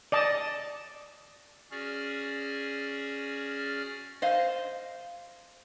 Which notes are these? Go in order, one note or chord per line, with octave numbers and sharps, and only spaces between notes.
D5 D#5 A5
C#4 F#4 G#4 D5 F6
C5 D#5 F5